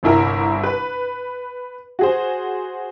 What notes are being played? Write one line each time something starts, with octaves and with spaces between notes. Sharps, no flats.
G1 C2 E4 A#4
B4
F#4 G#4 C5